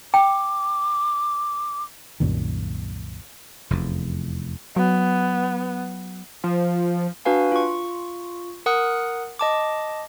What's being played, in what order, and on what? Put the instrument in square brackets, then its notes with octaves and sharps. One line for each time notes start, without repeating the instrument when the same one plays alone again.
[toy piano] G5 [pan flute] D6
[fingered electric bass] C2 F#2 A#2 D#3
[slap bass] F1 E2
[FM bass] F#3 [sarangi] B3
[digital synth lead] F3
[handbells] D4 F#4 B4 F5 G#5
F4 C#6
A#4 F#5 D#6 F#6
D#5 A5 D6